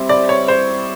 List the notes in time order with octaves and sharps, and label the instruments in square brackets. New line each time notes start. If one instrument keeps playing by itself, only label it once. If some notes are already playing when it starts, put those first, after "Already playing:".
Already playing: [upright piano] G3 C4 E4
[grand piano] D5
C#5
C5